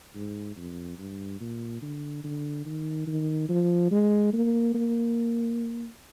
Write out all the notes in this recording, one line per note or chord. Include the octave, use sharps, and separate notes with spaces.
G#2
F2
G2
A#2
D3
D3
D#3
D#3
F3
G#3
A#3
A#3